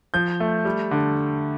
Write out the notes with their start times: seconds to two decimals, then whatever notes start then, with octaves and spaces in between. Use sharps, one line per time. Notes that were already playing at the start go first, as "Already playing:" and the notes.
0.14 F3 G6
0.40 A3
0.65 G3
0.91 D3